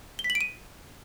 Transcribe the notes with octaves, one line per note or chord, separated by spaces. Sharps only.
G7
B6
F#7
D7
D#7